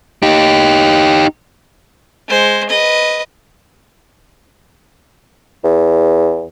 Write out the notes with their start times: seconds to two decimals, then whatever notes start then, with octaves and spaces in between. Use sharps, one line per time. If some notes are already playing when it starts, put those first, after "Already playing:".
0.23 D#4 G4
2.29 G#3 C5
2.69 B4 D#5
5.64 E2